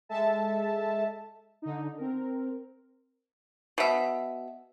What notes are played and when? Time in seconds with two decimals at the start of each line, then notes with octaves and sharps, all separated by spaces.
0.09 G#3 A4 E5 A5
1.62 D3 D#4
1.97 C4 A#4
3.78 B2 E5